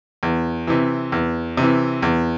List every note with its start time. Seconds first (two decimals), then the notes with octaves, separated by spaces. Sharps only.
0.23 E2
0.67 C3 E3
1.12 E2
1.57 C3 E3
2.02 E2